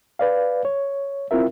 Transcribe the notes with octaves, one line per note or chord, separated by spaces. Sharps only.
B4 D5 F5
C#5
C4 E4 F4 A#4 E5